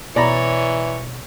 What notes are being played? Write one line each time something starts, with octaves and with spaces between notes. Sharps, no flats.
B2 E3 C#5 D5 A#5 B5